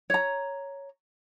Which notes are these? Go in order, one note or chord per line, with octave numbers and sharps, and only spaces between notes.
C#5 A#5